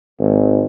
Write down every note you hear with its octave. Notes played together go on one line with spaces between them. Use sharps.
G#1